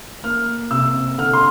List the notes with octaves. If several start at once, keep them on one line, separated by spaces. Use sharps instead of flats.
A#3 F6
C3 E6
D3 F6
C6